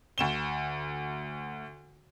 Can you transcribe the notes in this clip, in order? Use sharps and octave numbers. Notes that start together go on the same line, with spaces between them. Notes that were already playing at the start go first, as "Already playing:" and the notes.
D2 E7 G7